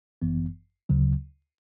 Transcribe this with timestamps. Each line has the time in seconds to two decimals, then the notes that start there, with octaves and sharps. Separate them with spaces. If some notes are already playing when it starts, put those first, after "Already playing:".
0.22 G1 F#2 E3 B3
0.89 D2 C#3 F#3